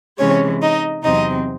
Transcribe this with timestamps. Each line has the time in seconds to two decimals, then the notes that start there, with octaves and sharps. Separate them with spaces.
0.18 C3 E3 G#3 C#4 C#5
0.61 D#4 D#5
1.03 E2 C3 F#3 C4 D#4 D#5